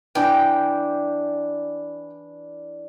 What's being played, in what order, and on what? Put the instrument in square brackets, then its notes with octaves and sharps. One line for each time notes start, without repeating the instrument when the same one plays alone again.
[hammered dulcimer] E3 D4 D6 [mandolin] G5